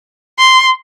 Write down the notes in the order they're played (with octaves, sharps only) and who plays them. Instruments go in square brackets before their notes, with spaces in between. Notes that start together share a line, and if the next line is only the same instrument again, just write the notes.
[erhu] C6